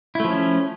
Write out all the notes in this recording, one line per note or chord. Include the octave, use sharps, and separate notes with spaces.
F3 A3 C#4 E4